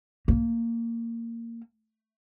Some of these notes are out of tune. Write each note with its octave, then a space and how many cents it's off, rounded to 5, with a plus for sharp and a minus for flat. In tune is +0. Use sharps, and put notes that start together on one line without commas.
A#3 -15